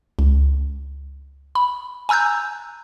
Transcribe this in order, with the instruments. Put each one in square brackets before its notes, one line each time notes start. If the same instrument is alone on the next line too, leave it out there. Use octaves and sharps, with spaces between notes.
[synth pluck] C#2
B5
G#5 A#5 E6 F#6 G6